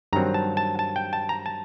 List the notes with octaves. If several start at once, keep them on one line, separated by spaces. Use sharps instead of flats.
G2 D#3 F#3 C4 A#5
A5
A5
A5
G5
A5
A#5
A5